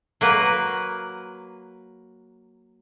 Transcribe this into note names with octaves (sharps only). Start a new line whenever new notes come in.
F#3 A#3 B4